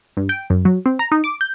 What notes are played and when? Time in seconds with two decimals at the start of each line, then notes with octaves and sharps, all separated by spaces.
0.17 G2
0.29 G5
0.50 F#2
0.65 F#3
0.86 C4
0.99 A#5
1.12 D#4
1.24 D6
1.41 G6